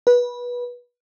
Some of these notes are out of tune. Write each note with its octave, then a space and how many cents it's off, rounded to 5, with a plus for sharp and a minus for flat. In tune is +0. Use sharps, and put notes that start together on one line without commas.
B4 -20